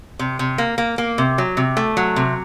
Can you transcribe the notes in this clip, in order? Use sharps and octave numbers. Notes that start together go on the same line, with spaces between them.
C3
C3
A#3
A#3
A#3
C3
F#3
C3
A3
F#3
C3